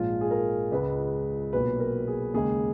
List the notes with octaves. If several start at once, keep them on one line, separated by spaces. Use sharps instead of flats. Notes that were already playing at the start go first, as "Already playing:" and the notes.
Already playing: A#1 G#2 F3 G#3 F4
G#4
A#4
C#2 C#3 G#3 B4
B1 A#2 F#3 B4
A#4
G#4
D#2 C#3 G#3 G#4